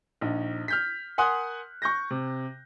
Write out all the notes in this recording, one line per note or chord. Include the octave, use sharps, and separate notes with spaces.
A#1 D#4
F6 G6 B6
A#4 F#5 G#5 C6 D#6 F#6
C#6 G6 A#6
C3